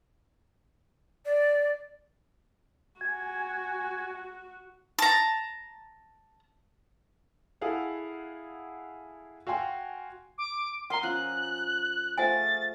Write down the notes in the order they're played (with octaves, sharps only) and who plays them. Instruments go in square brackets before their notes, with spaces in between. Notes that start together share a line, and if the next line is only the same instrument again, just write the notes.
[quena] D5
[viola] F#4 [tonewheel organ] G#5
[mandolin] A5 A#5
[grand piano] E4 G#4 A4 F5 F#5
F#4 F5 G5 G#5 C6
[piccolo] D6
[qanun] A#4 D#5 F5 [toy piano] F#5 A#5 [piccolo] C6
[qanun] F3 C#4 [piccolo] F#6
[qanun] A3 F4 G#4 [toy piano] C5 F#5 G#5 [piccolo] A6